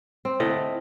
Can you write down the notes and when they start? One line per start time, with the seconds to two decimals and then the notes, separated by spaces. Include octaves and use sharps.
0.25 C4
0.40 E4 A4 D#5